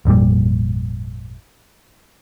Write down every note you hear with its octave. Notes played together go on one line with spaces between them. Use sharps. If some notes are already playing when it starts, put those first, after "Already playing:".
G#1 F2 A#2 G3